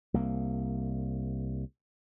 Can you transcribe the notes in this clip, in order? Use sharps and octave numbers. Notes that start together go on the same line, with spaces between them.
C2 A#3